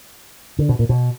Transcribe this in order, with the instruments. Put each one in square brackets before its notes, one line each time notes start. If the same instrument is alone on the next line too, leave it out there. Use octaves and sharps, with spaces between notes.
[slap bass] D3
B2
A#2
B2